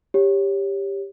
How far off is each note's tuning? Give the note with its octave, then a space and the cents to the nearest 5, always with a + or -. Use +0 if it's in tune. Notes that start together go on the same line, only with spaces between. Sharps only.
G4 +10 C#5 +0